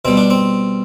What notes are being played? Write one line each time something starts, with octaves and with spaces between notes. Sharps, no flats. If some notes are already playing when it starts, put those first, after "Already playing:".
B2 G3 C4
D4
C4